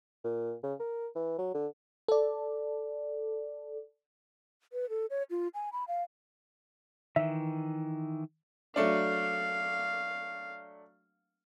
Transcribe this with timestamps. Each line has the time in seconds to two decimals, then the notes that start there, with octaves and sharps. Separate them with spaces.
0.24 A#2
0.63 C#3
0.80 A#4
1.15 E3
1.38 F#3
1.54 D3
2.08 A4 D5
4.73 B4
4.89 A4
5.10 C#5
5.30 F4
5.54 G#5
5.73 B5
5.88 F5
7.16 D#3 E3 E5
8.76 F#3 A3 D4 F5